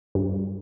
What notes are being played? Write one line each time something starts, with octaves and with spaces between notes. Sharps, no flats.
G2